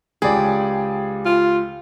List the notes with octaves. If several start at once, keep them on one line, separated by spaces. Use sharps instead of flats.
C#2 G4 G#4 D5
F4